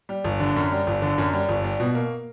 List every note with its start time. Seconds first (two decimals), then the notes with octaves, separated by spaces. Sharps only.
0.09 G3
0.24 G1
0.40 D3
0.56 F#2
0.72 G3
0.87 G1
1.02 D3
1.18 F#2
1.33 G3
1.49 G1
1.64 G3
1.80 B2
1.95 A#3